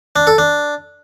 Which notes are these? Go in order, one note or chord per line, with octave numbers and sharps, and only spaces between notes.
D4
A4
D4